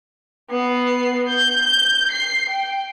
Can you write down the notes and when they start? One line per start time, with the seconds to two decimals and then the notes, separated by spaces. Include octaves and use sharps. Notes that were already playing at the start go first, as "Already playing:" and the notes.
0.50 B3 C7
1.27 G6
2.11 C7
2.49 G5